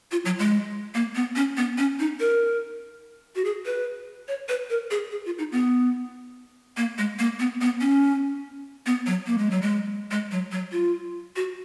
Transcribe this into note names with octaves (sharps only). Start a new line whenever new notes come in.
F4
F#3
G#3
A#3
B3
C#4
B3
C#4
D#4
A#4
F#4
G#4
B4
C#5
B4
A#4
G#4
G#4
F4
D#4
B3
A#3
G#3
A#3
B3
B3
C#4
B3
F#3
A#3
G#3
F#3
G#3
G#3
F#3
F#3
F4
F#4